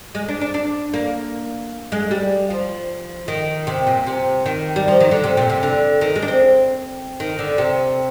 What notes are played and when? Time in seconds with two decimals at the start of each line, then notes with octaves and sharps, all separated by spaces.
0.15 G#3
0.28 D4
0.41 D4
0.54 D4
0.94 A#3
1.92 G#3
2.11 G3
2.50 F3
3.28 D#3
3.67 C3
3.87 A#2
4.07 C3
4.46 D#3
4.76 G3
4.88 F3
5.00 D#3
5.11 D3
5.24 C3
5.37 A#2
5.50 C3
5.63 D3
6.01 D#3
6.16 G#3
6.22 D4
6.28 C4
7.20 D#3
7.39 D3
7.58 C3